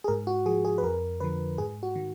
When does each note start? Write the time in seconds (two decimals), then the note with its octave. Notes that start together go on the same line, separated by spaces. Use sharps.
0.04 G#4
0.08 G#2 A#4
0.27 F#4
0.46 F3 G#4
0.65 G#4
0.78 B4
0.83 F2 A#4
1.20 D3 F3 B4
1.58 G#2 G#4
1.83 F#4
1.96 D#3